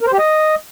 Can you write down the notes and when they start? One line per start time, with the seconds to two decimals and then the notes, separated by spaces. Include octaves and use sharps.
0.01 A#4
0.07 C5
0.13 G4
0.19 D#5